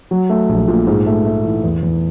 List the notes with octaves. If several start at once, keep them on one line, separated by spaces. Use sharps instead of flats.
F#3
A3
A#1
A#2
G#2
A3
A3
E3
E2
E2